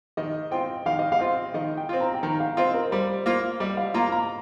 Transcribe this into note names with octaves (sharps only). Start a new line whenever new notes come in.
D#3 D#5
C4 F4 G5
D#3 F5
D#5
F5
C4 F4
D#3 D#5
G5
C4 F4
A#5
G5
D#3 A#5
F5
C4 F4 D#5
C5
A#4
G3 C5
A#3 F4 C5
G3 D#5
F5
A#3 F4 A#5
A#5